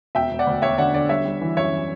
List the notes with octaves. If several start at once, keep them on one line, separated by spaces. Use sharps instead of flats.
E1 E5 G5
E1
D5 F#5
D2
E1 C#5 E5
D3 D5 F#5
D3 D5
G3 C#5 E5
G3
E3
F#2 C#5 E5
E3